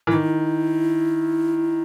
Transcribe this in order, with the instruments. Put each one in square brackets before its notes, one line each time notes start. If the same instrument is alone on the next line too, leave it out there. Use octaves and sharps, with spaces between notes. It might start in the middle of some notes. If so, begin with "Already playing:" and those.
[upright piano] E3
[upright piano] D#3 [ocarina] E4